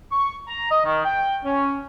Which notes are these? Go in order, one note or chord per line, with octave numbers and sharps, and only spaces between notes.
C#6
A#5
D#5
D#3
G5
C#4